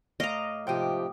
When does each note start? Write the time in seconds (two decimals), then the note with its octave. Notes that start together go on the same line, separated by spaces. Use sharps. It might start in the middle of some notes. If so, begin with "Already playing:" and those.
0.20 A2 D#5 F5 A#5 D6
0.67 G#2 C3 F3 G4 G5 D6 D#6